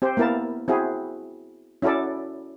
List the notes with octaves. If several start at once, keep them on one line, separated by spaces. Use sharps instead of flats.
C4 G4 C5
A#3 B3 E4 A#4 A5
C4 E4 F#4 G#4
C#4 E4 F#4 A4 D5